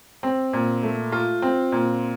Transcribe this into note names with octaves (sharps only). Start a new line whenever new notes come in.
C4
A#2
A3
F4
C4
A#2